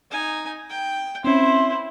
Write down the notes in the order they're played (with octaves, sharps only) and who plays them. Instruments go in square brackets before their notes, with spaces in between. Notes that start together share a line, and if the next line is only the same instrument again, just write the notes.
[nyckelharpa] D#4 G#5
G5
[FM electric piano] C4 C#4 [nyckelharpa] E4 C5 [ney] C6